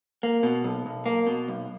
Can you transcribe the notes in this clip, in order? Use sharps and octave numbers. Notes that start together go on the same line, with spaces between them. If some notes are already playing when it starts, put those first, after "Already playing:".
A#3
B2
B1
B1
A#3
B2
B1